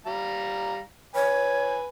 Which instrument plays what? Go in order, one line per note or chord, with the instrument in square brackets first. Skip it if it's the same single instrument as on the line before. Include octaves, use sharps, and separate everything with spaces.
[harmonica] G3 F5 A#5
[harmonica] B4 G#5 [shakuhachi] C#5